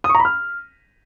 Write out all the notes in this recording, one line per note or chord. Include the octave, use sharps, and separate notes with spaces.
D#6
C#6
A#5
B5
F6